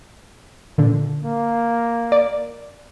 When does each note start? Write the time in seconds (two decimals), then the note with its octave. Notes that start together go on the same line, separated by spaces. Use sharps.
0.78 A#2 D3
1.24 A#3
2.12 D5